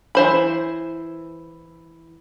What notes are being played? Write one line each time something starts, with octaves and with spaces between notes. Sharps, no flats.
E3 C5 B5